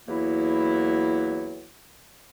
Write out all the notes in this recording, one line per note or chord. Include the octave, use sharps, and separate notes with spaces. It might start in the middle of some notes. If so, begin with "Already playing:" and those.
E2 F#3 A#3 E4